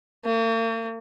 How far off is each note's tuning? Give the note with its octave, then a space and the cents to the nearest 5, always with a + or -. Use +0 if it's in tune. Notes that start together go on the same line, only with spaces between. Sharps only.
A#3 -45